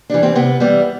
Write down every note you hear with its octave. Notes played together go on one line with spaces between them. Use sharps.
E3 G3 D4
C4
C3 B3
E3 G3 B3